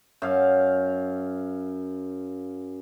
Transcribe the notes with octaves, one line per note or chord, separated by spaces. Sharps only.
F#2 F5